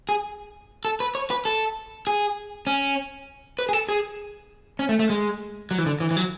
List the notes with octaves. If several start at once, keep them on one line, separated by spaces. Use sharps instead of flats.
G#4
A4
B4
C#5
B4
A4
G#4
C#4
B4
G#4
A4
G#4
C#4
A3
A3
G#3
F#3
E3
D3
E3
E3
F#3